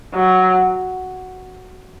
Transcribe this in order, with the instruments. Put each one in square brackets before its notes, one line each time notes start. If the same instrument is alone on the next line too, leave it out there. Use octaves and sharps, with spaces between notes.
[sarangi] F#3